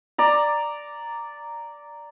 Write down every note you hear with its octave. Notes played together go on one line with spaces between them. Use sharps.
D5 A#5